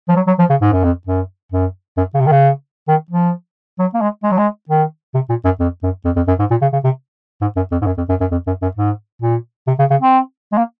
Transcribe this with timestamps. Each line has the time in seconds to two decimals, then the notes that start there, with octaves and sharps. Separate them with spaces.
0.09 F3
0.16 F#3
0.27 F#3
0.38 F3
0.50 C#3
0.61 G#2
0.72 F#2
0.83 F2
1.07 F#2
1.52 F#2
1.97 F#2
2.14 C#3
2.20 C3
2.27 D#3
2.31 C#3
2.88 D#3
3.10 F3
3.79 F#3
3.94 A#3
4.01 G#3
4.23 G#3
4.31 F#3
4.38 G#3
4.69 D#3
5.14 C3
5.29 A#2
5.44 F#2
5.60 F2
5.83 F#2
6.05 F2
6.16 F2
6.27 F#2
6.39 G#2
6.50 A#2
6.61 C#3
6.73 C#3
6.84 C3
7.41 G#2
7.56 F#2
7.71 F2
7.81 G#2
7.86 F#2
7.97 F2
8.09 F#2
8.20 F#2
8.31 F2
8.47 F#2
8.62 F#2
8.76 G#2
9.22 A#2
9.67 C3
9.79 C#3
9.90 C#3
10.01 C4
10.52 G#3
10.57 A#3